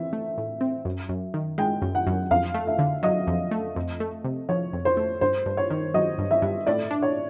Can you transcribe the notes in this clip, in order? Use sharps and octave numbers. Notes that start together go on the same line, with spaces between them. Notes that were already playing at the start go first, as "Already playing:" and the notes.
Already playing: E3 C4 E5
A3
A2
C4
F#2
F#2
D#3
G#3 G5
F#2
F#5
F#2
F2 F5
A3
E5
D3
F#3 D#5
F2
A3
F2
A3
C3
F3 C#5
F2
C5
A3
G2 C5
G2
C#5
D#3
F#3 D#5
G2
E5
G2
A2 D5
D4
C#5